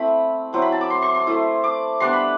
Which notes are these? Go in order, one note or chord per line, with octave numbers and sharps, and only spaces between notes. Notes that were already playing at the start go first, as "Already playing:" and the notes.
Already playing: A3 C4 E4 B5
F#3 C4 E4 C6
B5
A5
D6
C6
C6
C6
A3 E4
D6
G3 B3 D4 C6
B5